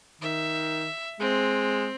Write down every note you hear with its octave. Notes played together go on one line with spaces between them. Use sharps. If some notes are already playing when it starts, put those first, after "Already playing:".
D#3 E5
G#3 C4